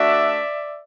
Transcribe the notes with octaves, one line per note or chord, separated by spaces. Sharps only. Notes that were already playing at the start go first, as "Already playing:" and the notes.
Already playing: A3 D4 F#4 D5 E5